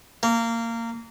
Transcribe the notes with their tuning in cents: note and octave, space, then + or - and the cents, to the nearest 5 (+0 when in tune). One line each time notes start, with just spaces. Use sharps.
A#3 -20